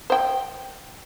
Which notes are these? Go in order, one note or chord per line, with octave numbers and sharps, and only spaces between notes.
C5 G5